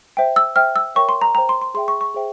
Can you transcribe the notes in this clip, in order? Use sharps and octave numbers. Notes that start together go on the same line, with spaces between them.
C5 E5 G5
E6
C5 E5 G5 F6
E6
A#4 C#5 E5 G5 C#6
C6
A#5
C5 G5 A#5
C6
C6
G#4 E5 G5 C6
C#6
C#6
G#4 C5 E5 G5